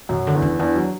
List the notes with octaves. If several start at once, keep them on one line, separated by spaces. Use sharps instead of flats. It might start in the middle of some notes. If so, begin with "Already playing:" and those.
F#2 B2 F#3
D3
E2 E3
C#4
E2 E3 D4
F#3